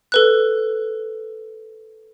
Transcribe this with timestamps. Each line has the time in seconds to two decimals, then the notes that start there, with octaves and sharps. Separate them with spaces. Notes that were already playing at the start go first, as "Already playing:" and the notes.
0.12 A4 B4 F#6